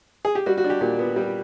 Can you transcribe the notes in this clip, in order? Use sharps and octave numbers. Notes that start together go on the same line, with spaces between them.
G#4
G4
G3 F#4
F#4
D4
G4
A#2 G4
B3
G3